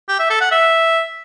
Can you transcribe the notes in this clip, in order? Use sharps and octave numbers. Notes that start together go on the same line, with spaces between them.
G4
E5
A4
F#5
E5